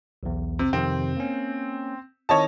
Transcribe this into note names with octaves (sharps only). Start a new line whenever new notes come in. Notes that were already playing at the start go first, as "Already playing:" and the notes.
B1 E2
C3
F2 C3 D#3 C4
A#3 C#4
D#3 C4 E4 C#5 D#5 A5